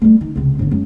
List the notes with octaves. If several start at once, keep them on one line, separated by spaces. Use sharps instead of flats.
G3 A3
D#3
C#2 C3
G1 D3
F#2 G#3